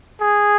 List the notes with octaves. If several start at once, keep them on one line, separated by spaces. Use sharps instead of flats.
G#4